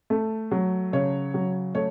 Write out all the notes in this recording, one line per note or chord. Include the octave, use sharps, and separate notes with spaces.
A3
F#3
C#3 C#5
F#3
A3 C#5